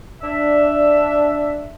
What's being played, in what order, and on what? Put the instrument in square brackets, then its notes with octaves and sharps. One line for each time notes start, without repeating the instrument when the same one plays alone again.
[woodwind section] D4 E5